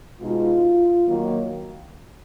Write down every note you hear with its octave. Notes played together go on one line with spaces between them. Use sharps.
B2 G#3 D#4 F4
D#3 F#3 A#3